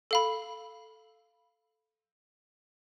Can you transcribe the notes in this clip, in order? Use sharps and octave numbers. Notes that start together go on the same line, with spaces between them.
A4 F5 B5